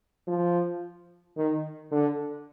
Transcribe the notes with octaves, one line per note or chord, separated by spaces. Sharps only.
F3
D#3
D3